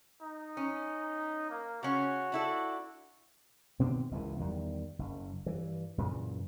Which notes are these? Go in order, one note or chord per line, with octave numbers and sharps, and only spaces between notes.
D#4
C#4
A#3
C#3 C#4 F#4
D4 E4 A4
B2 D#3 B3 C4
F#1 C#2 F#2 E3
E2 D#3 G3
F#1
G2 E3
F#2 A#2 C#3 E3